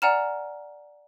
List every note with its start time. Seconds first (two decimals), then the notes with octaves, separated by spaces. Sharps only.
0.02 D5 F#5 G#5 A#5 F6 E7